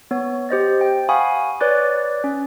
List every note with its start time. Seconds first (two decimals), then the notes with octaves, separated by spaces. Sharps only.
0.11 B3 C#5
0.49 G4 C5 D#5 A6
0.81 G5
1.09 F5 F#5 G#5 B5 C#6 D#6
1.60 B4 C#5 D5 D6 F#6 A6
2.24 C#4